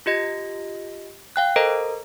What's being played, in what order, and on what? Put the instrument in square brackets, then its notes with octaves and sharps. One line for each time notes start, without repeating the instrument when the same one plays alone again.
[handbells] F4 G4 D#5 A#6
F5 G5 F#6
A4 A#4 C5 D#5 A#5